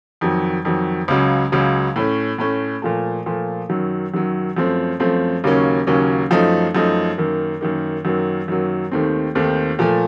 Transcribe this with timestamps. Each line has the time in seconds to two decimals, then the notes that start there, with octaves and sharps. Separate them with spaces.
0.21 F2 D#3 F#3
0.65 F2 D#3 F#3
1.08 C#2 C#3 F#3
1.52 C#2 C#3 F#3
1.96 A2 A3 C#4
2.38 A2 A3 C#4
2.82 A#2 F3 A3
3.26 A#2 F3 A3
3.69 F#2 D#3 F#3
4.14 F#2 D#3 F#3
4.57 F#2 F3 A3 C4
5.00 F#2 F3 A3 C4
5.44 D#2 C#3 F#3 A#3 C#4
5.87 D#2 C#3 F#3 A#3 C#4
6.31 F#2 F3 A3 D#4
6.75 F#2 F3 A3 D#4
7.18 F#2 D#3 A#3
7.61 F#2 D#3 A#3
8.05 F#2 D#3 F#3 A#3
8.48 F#2 D#3 F#3 A#3
8.91 D#2 D#3 A3 C4
9.35 D#2 D#3 A3 C4
9.79 A#2 F3 A3